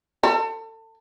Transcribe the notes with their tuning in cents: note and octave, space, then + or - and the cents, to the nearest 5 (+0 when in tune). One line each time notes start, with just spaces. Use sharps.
A4 +30